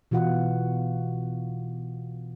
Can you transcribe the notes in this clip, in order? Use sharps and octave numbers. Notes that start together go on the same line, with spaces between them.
B2 E3 F4 F#4 F#5